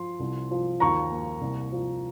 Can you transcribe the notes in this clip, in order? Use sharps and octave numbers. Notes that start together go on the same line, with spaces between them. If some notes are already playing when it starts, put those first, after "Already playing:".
Already playing: F3 C6
C2
F3
D#2 A#5 C#6
A#3
C2
F3